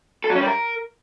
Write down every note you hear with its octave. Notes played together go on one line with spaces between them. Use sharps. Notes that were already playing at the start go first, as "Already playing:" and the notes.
A4
F#3
C#4
G3
A#4